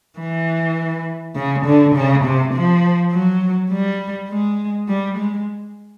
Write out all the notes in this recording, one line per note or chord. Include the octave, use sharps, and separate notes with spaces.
E3
C#3
D3
C#3
C3
F3
F#3
G3
G#3
G3
G#3